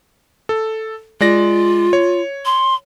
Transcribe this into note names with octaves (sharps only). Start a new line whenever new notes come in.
A4
G#3 F4 D5 A#6
C#5
C6